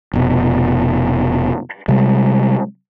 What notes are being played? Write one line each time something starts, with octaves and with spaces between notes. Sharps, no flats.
F1 B2
C3 G3 G#3